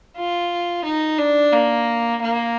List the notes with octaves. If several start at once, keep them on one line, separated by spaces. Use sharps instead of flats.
F4
D#4
D4
A#3
A#3